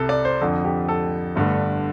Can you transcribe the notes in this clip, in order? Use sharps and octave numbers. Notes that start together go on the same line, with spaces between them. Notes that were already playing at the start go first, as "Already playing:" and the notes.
Already playing: C2 C3 A4
D5
C5
F2 D3 F3 A4
G4
A4
G1 G2 D3 A3